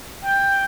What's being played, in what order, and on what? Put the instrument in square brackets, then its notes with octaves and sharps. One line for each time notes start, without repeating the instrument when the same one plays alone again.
[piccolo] G5